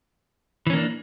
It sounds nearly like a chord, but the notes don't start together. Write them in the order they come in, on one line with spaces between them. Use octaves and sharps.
E3 C#4 A#3 D4